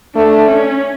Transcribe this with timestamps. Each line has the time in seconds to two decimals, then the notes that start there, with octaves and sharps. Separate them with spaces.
0.15 A3 D4
0.48 C#4